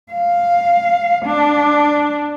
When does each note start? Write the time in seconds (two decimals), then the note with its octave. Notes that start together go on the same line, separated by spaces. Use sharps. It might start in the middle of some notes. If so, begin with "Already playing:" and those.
0.12 F5
1.26 D4